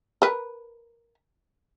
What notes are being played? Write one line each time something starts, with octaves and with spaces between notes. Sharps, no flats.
A#4 B4